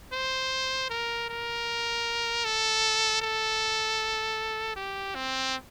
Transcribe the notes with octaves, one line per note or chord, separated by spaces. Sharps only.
C5
A#4
A#4
A4
A4
G4
C4